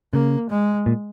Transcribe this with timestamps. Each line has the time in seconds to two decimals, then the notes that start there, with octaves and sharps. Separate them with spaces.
0.13 C#3 A#3
0.50 G#3
0.86 A#2